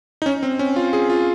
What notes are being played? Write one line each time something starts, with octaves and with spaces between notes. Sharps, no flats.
D#4
C#4
C4
C#4
F4
G#4
F4